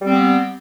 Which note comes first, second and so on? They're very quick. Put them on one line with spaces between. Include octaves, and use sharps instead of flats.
G3 C4 B3